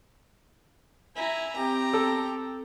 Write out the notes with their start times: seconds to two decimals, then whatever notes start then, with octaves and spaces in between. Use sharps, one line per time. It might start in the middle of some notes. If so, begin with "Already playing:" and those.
1.16 E4 G#5 A#5
1.57 C4 G4 A#5
1.93 A4